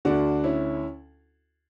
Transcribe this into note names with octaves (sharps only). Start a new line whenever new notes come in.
D2 D3 D4 F#4
C#4 E4